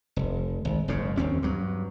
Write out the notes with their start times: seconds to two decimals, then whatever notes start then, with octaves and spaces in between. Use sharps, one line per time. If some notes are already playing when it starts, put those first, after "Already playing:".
0.16 F1
0.65 G#1
0.88 F#1 G#2 C#3
1.17 D#2 C4 C#4
1.43 G2 F#3